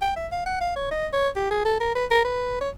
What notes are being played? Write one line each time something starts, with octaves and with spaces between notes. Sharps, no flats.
G5
E5
F5
F#5
F5
C#5
D#5
C#5
G4
G#4
A4
A#4
B4
A#4
B4
C#5